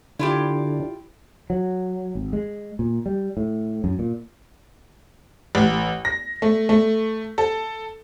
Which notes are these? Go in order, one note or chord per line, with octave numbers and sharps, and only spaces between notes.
D3 E4 F4 G4
F#3
G#1
G#3
A#2
G3
A2
F#2
A#2
A1
A#6
A3
A3
A4